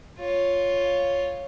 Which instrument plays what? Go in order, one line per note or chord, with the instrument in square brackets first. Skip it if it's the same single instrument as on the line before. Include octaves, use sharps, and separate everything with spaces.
[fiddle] F4 C#5